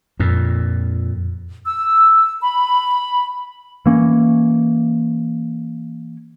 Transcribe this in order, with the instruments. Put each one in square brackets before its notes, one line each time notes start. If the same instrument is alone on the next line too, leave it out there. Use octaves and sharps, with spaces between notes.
[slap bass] F2 A#2
[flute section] E6
B5
[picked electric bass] E3 A#3 C#4